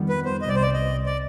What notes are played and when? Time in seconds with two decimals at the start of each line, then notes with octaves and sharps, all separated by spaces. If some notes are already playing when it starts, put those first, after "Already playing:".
Already playing: F2 D#3 G3 B3
0.09 B4
0.25 C5
0.41 C2 C3 G3 D#5
0.48 D5
0.56 C5
0.62 D5
0.74 D#5
1.06 D5